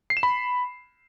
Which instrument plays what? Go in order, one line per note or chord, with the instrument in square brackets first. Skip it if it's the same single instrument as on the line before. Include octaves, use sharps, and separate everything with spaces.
[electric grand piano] C7
E7
B5